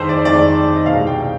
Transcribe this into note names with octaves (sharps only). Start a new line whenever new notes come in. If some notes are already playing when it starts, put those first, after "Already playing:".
Already playing: F2 D#3 G#3 C5
D5
F2 D#3 G#3 D5
D#5
C2 B2 G#3 F5
G5